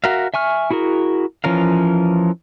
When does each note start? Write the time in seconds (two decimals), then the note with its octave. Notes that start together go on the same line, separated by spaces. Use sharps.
0.04 F#4 A#4 E5 F5
0.34 E5 G#5 C#6 F6
0.71 E4 F#4 G#4 A#4
1.44 E3 F3 C#4 A#4 F5